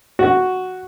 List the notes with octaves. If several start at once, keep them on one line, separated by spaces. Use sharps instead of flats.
F#4